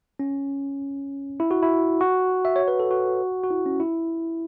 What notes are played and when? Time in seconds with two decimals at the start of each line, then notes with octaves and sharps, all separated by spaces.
0.19 C#4
1.40 E4
1.51 F#4
1.63 E4
2.01 F#4
2.45 E5
2.56 C#5
2.68 B4
2.80 A4
2.91 F#4
3.44 F#4
3.50 E4
3.66 C#4
3.80 E4